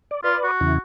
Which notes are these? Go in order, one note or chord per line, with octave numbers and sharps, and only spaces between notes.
D5
F4 B4 D5
F#4
E2 C#3 E4